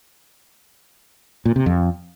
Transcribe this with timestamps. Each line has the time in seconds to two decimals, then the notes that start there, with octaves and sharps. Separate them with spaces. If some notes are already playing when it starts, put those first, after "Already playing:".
1.45 A#2
1.56 C3
1.66 F2